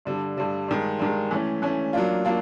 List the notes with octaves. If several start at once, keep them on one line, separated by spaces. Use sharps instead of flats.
G2 D3 G3
G2 D3 G3
G2 D#3 G#3
G2 D#3 G#3
E3 A3 C#4
E3 A3 C#4
F#3 A#3 D4 F4
F#3 A#3 D4 F4